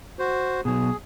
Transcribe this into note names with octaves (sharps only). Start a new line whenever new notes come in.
F#4 C5
B2 F#3 G#4